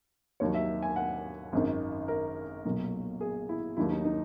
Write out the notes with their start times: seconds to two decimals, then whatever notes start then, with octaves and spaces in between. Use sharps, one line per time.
0.40 D#2 D#3 F#3 C#5
0.54 E5
0.82 G#5
0.96 F#5
1.53 G#1 F#2 D#3
2.08 A#4
2.65 B1 A#2 F#3
3.21 G#4
3.49 E4
3.77 D#2 D#3 F#3 E4
3.91 D#4
4.05 D#4